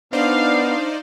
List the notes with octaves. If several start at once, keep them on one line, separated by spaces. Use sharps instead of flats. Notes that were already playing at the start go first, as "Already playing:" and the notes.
B3 D4 D#4 C5 D5 F5